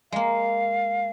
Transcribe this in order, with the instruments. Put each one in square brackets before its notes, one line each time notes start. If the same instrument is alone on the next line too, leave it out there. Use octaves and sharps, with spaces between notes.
[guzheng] G#3 A#3 [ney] F5